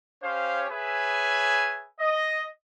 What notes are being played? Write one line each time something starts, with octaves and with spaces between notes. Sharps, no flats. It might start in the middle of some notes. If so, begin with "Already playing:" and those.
C#4 G4 C5 C#5 F5
G#4 B4 C#5 E5 G#5
D#5